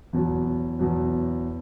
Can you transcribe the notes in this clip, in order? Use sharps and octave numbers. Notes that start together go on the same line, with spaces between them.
E2 B2 F#3
E2 B2 F#3